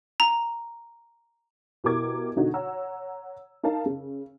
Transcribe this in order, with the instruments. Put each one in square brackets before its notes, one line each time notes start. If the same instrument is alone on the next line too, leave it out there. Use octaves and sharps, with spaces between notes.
[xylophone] A#5
[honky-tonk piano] B2 E4 G4 A#4 D6 G#6
B2 D3 D#4 F#4
C#5 F#5 A#5 E6
D#4 A#4 F5 A5
C#3